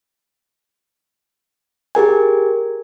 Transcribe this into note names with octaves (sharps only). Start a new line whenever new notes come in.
G4 G#4 A#4 G#5